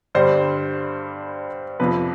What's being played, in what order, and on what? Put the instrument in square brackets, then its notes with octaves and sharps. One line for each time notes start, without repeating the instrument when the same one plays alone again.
[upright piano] G2 D3 G3 C5
F2 C3 F3 B4